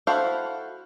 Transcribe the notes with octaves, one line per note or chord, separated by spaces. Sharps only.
E4 F#4 A4 C5 F5